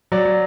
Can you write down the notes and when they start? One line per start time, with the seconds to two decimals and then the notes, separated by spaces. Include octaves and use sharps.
0.12 F#3 D5
0.25 F#3